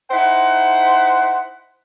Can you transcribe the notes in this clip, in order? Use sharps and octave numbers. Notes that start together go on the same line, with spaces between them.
D#4 E4 C5 F#5